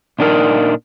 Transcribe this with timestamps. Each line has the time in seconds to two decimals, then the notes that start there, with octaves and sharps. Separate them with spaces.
0.19 A#2 D4 D#4 A#4